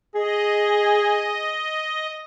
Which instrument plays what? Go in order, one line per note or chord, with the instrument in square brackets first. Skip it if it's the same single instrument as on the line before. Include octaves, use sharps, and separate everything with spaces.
[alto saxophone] G#4 [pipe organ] D#5